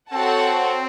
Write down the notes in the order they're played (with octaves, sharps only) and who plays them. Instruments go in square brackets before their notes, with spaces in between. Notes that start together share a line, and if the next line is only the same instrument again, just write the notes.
[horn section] C4 [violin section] F#4 A4 C#5 F#5 A5